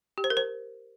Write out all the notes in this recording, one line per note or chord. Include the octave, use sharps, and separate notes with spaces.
G4
C5
A#4
C5